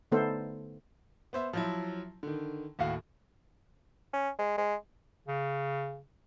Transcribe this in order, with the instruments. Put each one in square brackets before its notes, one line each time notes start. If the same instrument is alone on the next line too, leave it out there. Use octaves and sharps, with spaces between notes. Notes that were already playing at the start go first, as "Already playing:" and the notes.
[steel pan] D3 A3 B3 D#4 A4 C5
[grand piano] B3 C5 E5
F3 F#3 E4
D3 D#3
D#2 A2 F#4 F5
[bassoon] C#4
G#3
G#3
[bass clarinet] C#3